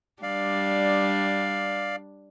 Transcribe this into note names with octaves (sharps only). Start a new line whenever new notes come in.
G3 D4 D5 F5